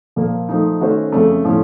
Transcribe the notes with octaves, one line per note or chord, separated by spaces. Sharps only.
A#2 F3 A#3
F3 A3 D#4
D#3 A3 C#4 F#4 C5
F2 C#3 A3
A2 F3 A3 C#4